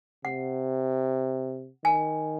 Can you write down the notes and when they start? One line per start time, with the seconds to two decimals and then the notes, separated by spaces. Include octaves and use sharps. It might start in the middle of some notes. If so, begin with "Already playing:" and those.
0.25 C3 F#5
1.85 D#3 G#5